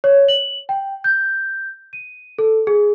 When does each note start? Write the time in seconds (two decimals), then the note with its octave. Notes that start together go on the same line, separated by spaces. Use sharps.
0.04 C#5
0.28 F#7
0.69 G5
1.04 G6
1.93 D#7
2.39 A4
2.67 G#4